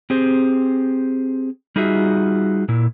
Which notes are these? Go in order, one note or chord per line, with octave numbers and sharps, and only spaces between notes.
C4 G4 G#4 C5
G3 D#4 F4 F#4 G#4 E5
A#2 E4